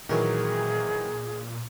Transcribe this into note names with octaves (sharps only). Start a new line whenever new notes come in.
A#2 D#3 E3 F#3 G#4 A#4 C#5